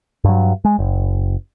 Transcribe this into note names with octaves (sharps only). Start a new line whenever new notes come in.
G2 F#3
G#3
F#1